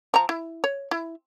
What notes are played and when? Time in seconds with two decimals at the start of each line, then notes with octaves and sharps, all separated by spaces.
0.14 F3 A#5
0.29 E4
0.64 C#5
0.91 E4